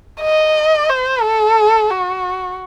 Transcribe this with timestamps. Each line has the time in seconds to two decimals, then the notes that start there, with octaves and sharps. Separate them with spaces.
0.21 D#5
0.89 C5
1.23 A4
1.91 F#4